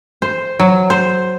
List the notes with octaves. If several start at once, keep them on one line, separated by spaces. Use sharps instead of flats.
C5
F#3
C5